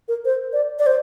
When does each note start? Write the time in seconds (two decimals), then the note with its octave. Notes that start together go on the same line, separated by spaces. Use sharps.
0.08 A#4
0.25 C5
0.53 D5
0.79 D5
0.86 C5